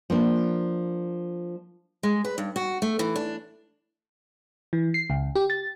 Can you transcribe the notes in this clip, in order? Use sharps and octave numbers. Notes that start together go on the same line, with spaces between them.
F3 A#3 D4
G#3
B4
G2
F#4
A3
E3
D4
E3
C7
C#2
G4
A6